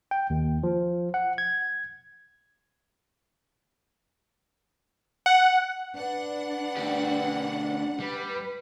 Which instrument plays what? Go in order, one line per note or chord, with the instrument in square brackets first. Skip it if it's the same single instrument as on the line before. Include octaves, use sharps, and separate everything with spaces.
[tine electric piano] G5
D#2
F3
F#5
G#6
[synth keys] F#5
[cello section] D4 [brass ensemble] B4 [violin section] F#5
[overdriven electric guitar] D2 G4
[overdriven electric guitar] G3 [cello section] B4